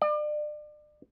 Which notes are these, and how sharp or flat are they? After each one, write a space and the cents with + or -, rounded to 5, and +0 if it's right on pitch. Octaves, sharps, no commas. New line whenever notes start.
D5 +35